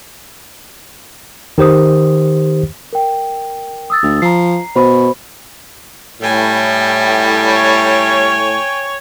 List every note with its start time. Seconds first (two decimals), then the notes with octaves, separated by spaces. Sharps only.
1.58 D#3 G4 C5 D#6
2.93 A#4 G5
3.90 D#6 E6 A6
4.03 D2
4.22 F3 A#5 C7
4.76 B2 C5 B5 C#6
6.21 A2 G3 G5 G#5
7.50 C#5